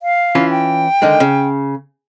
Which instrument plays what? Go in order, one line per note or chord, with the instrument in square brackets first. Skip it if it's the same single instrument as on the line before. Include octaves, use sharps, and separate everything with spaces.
[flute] F5
[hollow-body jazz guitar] E3 C#4 F4
[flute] G5
[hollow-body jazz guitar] D3 D#3 G#3
C#3